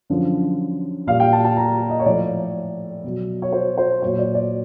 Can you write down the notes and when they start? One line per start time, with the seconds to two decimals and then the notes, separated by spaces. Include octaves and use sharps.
0.10 F#2 D3 F3
1.07 A#2 G3 F5
1.20 G5
1.33 A5
1.44 A5
1.57 A#5
1.90 D#5
2.00 C#5
2.05 A2 F3 D5
3.04 B2 F#3
3.42 C#5
3.52 C5
3.78 C5
4.02 A#2 F#3 C#5
4.18 D5
4.34 D5